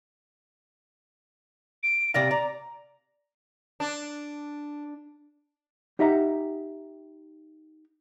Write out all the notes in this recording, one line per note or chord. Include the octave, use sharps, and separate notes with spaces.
D7
C3 D5 F5 A#6
D5 A#5
D4
D#4 G4 D#5 E5 F#5 A#5